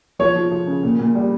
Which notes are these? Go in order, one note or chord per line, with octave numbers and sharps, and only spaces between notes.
F3 C#5
F3
F3
C#3
A#2
A#2
G3